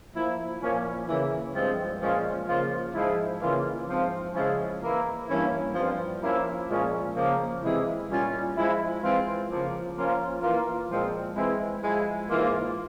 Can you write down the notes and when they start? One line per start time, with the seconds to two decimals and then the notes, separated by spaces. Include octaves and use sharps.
0.13 F3 A#3 E4
0.60 A#2 F3 A#3 C#4
1.07 C#3 E3 A#3 E4
1.53 G2 F3 G#3 C4
2.00 A#2 F3 G#3 C#4 F4
2.47 C#3 F3 A#3 F4
2.94 G#2 F3 G#3 E4
3.40 C#3 E3 A#3 F4
3.88 G#2 F3 C4 F4
4.34 C#3 F3 G#3 C#4 E4
4.81 E3 A#3 E4
5.27 G2 E3 A#3 C#4 E4
5.74 G2 F3 C4 F4
6.21 F3 A#3 C#4 E4
6.68 A#2 F3 G#3 C#4
7.15 C#3 F3 A#3
7.62 C3 E3 G#3 E4
8.09 A#2 G3 C#4 F4
8.56 F3 G#3 E4
9.02 E3 G#3 C4 F4
9.49 C#3 F3 A#3
9.96 F3 A#3 C#4 F4
10.42 E3 A#3 F4
10.89 A#2 F3 G#3 C4
11.36 E3 G#3 C4 E4
11.83 F3 G#3 E4
12.29 G#2 E3 A#3 F4